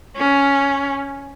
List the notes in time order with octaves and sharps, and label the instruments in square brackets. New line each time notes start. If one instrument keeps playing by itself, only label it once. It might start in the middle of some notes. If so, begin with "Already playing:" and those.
[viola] C#4